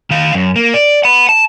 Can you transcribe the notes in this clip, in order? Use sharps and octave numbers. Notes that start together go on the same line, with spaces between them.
D#3 F5
F#2
A#3
D5
F#5 B5
A5